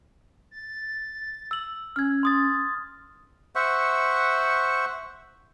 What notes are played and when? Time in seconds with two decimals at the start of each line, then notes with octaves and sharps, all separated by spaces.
0.51 A6
1.51 E6 F#7
1.96 C#4 F6 G#6
2.23 C6 D#6 A6
3.56 C5 E5 F#5 C#6